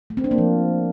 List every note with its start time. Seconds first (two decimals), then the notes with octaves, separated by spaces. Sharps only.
0.10 A3
0.17 C4
0.24 D4
0.31 A#3
0.38 F3